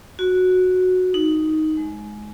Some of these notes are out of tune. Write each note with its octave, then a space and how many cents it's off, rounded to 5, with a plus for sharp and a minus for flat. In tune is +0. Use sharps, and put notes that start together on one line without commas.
F#4 -10
D#4 +5
G#3 +20